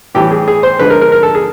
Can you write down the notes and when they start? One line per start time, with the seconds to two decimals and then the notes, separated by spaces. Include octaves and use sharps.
0.14 A2 E3 G3 G4
0.31 G#4
0.48 G#4
0.63 C5
0.79 D3 F3 G#3 B4
0.90 A#4
1.01 A#4
1.12 A#4
1.23 A4
1.35 G#4